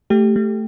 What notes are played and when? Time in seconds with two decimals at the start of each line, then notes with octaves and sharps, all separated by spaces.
0.10 A3 G4
0.36 A3